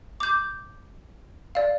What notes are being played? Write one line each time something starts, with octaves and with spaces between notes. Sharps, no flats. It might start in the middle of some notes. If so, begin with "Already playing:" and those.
D6 G6
D5 F5